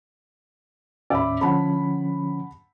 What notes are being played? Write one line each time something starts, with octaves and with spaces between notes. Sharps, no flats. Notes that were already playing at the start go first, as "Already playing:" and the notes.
D#2 A2 C#4 D5 E5 B5
D3 F3 C#4 F#5 A5 B5